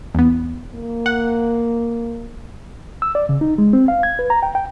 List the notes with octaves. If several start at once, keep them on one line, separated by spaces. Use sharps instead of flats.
E2 B3
A#3
F#5
E6
D5
C#3
D#4
G#3
C4
F5
G#6
B4
A#5
G5
G5